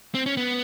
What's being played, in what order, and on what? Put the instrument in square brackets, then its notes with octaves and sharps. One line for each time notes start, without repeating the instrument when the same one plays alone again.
[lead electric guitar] C4
C#4
B3